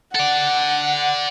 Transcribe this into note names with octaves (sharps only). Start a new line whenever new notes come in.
A4 D5 F#5